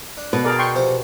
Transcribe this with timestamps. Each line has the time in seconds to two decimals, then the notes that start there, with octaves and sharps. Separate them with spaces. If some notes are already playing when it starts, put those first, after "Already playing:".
0.17 D4
0.33 B2 B4
0.44 G#4 A#4 D5
0.59 G5 C6 C#6
0.76 C3 F3 C5